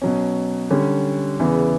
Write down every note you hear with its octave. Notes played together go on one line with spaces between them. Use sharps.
B2 F#3 C#4
D3 G3 C#4
E2 C#3 E3 B3